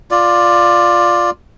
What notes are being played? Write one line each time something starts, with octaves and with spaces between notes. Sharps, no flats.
F4 D5